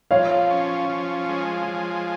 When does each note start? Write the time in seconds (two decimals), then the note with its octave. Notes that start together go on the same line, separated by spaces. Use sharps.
0.11 F3 C#5 F5
0.51 C#4
0.89 F3
1.29 G#3
1.67 F3